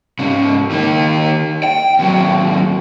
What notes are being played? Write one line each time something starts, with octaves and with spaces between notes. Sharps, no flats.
G#2 C#3
D#3 A#3
G5
D#2 F#3